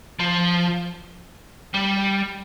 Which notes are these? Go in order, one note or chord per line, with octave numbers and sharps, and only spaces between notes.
F3
G3